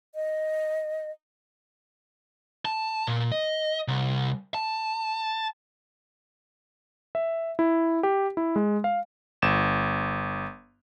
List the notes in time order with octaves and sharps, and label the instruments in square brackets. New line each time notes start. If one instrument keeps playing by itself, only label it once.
[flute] D#5
[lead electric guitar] A5
A#2
D#5
C2
A5
[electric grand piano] E5
E4
G4
E4
G#3
F5
G1 E7